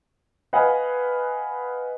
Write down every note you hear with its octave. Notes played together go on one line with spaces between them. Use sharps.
B4 D#5 F5 F#5 G#5